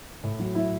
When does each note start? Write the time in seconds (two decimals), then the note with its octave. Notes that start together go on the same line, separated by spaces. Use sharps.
0.24 A2
0.40 F#3
0.55 F#3 E4